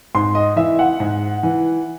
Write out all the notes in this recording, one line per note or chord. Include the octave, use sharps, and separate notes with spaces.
G#2 C6
D#5
E3 E5
F#5
G#2
E3